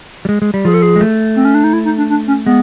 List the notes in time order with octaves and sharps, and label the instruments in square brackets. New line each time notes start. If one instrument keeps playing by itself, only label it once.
[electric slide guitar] G3
G#3
G#3
G3
[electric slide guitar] F3 [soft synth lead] G#4
[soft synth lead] A4
G#4
[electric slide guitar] G#3
A3
[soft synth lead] C4
C#4
D4
D#4
E4
D#4
D4
D4
C#4
[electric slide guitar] G#3 [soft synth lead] B3